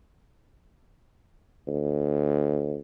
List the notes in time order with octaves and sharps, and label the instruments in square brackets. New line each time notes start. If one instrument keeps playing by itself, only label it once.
[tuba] D2